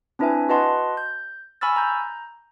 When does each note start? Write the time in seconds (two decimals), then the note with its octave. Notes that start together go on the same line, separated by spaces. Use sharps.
0.19 C4 D4 E4 B4 E5 G#5
0.49 F#4 B4 D#5 F#5 A5 C6
0.97 G6
1.61 G#5 B5 C#6 E6 F6 A6
1.76 A#5 G6